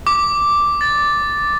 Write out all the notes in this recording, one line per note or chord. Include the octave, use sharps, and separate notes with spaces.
D6
A6